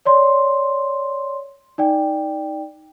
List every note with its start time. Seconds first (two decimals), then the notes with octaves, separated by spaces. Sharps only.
0.05 C#5 D5 C6
1.78 D#4 D5 G5